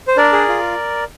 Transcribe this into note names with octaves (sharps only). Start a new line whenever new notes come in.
C5
D4 A#4 D5
G#4
F4